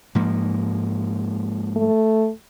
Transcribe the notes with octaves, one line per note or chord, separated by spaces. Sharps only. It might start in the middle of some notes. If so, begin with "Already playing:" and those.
G#2 F3 A#3
A3